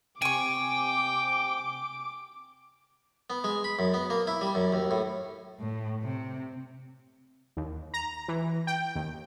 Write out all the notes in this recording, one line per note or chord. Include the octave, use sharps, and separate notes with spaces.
C3 G5 G#5 C#6 D6
B3
G#3
B5
F#2
B3
A#3
E4
G3
F#2
D#2
A2
A2
C3
D#2
A#5
E3
G5
D#2